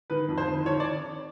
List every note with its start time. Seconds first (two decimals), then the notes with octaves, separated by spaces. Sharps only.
0.10 D#3 B4
0.29 F2
0.38 C5
0.47 D#3
0.66 D#3 C#5
0.80 D5